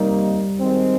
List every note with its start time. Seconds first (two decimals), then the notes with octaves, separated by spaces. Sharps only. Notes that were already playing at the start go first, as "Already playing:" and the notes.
Already playing: C3 D#3 G3 A#3 D#4
0.60 D#3 G#3 C4